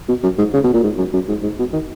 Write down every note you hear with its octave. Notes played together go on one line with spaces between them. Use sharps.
B2
F#2
G#2
C#3
B2
A#2
G#2
F#2
F#2
G#2
G#2
B2
D#3